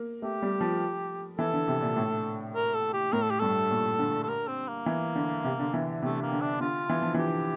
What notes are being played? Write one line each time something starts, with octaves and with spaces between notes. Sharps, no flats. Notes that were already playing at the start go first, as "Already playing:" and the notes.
Already playing: A#3
A3 G4
G3
F3
E3 A4
D3
C3
A#2
A2
A#4
A4
G4
A2 A#4
A4
G4
G2 A4
A#2
D3
A4
A#4
C4
A#3
E3
D3
C3
D3
E3
C3 A3
A#3
D3
D4
D3 F4
E3
F3
E3 G4